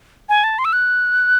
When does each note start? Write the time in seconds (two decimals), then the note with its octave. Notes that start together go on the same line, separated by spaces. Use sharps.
0.29 G#5
0.44 A5
0.59 C6
0.65 E6
0.73 F#6